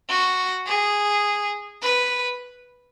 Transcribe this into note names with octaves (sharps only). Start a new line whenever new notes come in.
F#4
G#4
B4